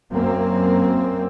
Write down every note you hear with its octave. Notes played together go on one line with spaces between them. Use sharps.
F#2 A#3 C4